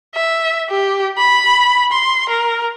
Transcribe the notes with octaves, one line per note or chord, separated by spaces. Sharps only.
E5
G4
B5
C6
A#4